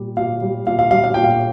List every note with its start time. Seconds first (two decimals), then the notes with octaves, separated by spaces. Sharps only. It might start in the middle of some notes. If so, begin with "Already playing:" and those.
Already playing: A#2 G3
0.17 A#2 F5
0.42 G3
0.67 A#2 F5
0.79 F5
0.91 G3 F5
1.04 F5
1.14 A#2 G5
1.24 F5